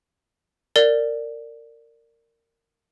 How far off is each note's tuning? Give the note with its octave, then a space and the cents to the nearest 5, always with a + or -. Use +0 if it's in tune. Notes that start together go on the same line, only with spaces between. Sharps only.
A#4 -20 D5 +0